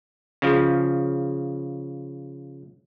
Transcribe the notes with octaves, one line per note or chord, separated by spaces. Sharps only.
C#3 F3